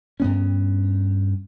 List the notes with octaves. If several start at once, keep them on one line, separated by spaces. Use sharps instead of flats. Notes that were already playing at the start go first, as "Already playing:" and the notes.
G2 B3 C#4